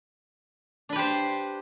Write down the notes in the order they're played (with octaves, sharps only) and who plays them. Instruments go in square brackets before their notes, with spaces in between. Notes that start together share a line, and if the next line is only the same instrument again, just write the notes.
[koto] D4
B4
G4
C5